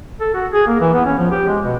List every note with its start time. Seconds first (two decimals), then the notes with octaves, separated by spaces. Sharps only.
0.21 A4
0.34 F#4
0.52 G#4
0.67 A#3
0.80 E3
0.94 B3
1.06 C#4
1.18 F3
1.31 G4
1.47 G#3
1.64 B2